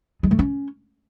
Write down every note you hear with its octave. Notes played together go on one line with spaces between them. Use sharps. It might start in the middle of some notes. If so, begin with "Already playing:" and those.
G#3
A3
C#4